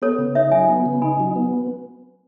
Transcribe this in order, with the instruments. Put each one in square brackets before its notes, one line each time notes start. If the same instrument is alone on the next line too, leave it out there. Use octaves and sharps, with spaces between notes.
[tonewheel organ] B3 [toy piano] A4 C#5
[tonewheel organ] C#3
[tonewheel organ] D#4 [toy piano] C#5 E5
[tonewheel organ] F#3 [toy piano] E5 G#5
[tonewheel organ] B3
C#3
[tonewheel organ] D#4 [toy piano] G#5 B5
[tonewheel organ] F#3
B3